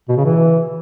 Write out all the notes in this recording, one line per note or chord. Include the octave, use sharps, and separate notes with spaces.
B2
C#3
E3